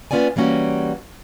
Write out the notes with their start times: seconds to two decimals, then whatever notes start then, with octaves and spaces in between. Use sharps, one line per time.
0.11 A#3 B3 C#4 F4 D5 G#5
0.36 E3 G3 A#3 C#4 F#4